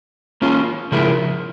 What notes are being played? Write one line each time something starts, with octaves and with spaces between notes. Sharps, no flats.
A#3 C#4 F4
C#3 F3 G#3 E4 A#4